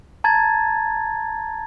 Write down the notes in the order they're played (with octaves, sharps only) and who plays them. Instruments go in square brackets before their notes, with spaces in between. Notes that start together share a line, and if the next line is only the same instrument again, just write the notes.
[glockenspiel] A5 A#5 G#6 A6